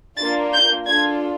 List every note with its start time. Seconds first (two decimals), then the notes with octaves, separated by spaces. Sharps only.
0.17 A#3 D4 F4 A6
0.53 G6
0.87 D4 F4 A4 G#6